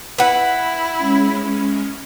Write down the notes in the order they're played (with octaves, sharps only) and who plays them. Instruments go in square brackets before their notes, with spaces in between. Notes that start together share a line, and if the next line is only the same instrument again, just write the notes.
[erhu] E4 [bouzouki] B4 F#5
[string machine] G#3 C#4